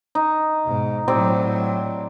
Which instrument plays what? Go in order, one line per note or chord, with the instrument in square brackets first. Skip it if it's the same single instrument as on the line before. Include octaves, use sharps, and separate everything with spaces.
[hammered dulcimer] D#4
[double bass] G#2 B2
[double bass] A2 F#3 [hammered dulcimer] C4 G4 D5